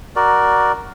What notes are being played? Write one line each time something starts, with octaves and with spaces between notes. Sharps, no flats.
F#4 A#4 D5